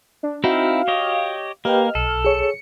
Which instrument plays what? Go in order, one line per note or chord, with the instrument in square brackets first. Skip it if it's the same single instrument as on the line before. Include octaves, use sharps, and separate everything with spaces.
[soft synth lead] D4
[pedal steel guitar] C4 D#4 E4 [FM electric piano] F#4 [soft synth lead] F5
[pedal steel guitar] G4 C#5 D#5
[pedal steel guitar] A#3 [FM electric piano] G4 B4 G5 [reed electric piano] D#5 [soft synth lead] F6
[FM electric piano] B1 [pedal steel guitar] A4
[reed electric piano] G#4 C#5 [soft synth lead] C#7